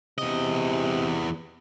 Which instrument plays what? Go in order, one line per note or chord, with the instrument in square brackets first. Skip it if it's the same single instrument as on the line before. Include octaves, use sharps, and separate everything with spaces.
[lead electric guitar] E2 D#5 [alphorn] C3